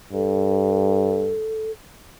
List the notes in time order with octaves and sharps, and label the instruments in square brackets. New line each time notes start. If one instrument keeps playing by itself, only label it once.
[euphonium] G2 [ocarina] A4